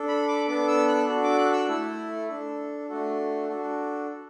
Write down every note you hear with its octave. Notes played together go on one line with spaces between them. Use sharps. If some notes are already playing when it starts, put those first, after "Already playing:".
Already playing: D4 A4
B5
D6
B3 D4 A4 D6
E6
F#6
D4 F#4 A4
D6
F#6
E6
A3 E4 A4
D4 A4
A3 D4 F#4 A4
D4 F#4 A4